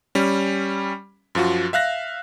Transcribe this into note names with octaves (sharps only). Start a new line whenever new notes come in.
G3 C#4
F#2 F3 F4 F#4
E5 F5 F#6 A#6